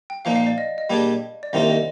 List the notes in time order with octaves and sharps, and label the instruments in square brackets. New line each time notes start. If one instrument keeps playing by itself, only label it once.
[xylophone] G5
[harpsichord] A#2 F3 A#3 D#4 [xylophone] F5
[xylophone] F5
D5
D#5
D#5
[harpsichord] A#2 G3 D4 G#4 D5
[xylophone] D5
[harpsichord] C2 C3 D#3 A#3 F4 [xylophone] D#5
[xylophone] D#5